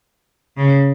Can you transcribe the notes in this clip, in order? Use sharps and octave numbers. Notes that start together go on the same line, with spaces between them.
C#3